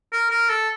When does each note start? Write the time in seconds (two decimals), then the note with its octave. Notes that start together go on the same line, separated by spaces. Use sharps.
0.12 A#4
0.30 A#4
0.49 A4